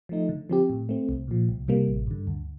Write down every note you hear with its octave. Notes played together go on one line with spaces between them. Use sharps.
F3 A3 D#4
D3
F3 C4 G4
A2
A3 C4
C2
A#2 F3
C2
C3 G3 A#3
A1
G2 D3
D2